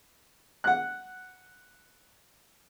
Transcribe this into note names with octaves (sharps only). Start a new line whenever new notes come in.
F#5 F#6